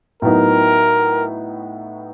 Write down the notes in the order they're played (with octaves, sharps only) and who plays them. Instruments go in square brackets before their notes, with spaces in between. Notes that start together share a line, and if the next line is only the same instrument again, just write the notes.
[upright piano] A2 F#3 B3 D#4 [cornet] A#4